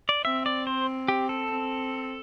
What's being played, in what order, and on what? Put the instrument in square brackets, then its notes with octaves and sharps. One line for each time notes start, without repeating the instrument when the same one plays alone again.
[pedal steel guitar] D5
[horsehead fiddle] C4 [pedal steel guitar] E5
[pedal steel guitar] D5
C5
G4
A4
[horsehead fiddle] C4